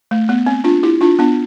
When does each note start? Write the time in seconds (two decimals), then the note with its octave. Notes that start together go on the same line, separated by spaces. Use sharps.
0.11 A3
0.29 B3
0.46 C4
0.64 D4 F4
0.83 E4 G4
1.01 D4 F4
1.19 B3 D4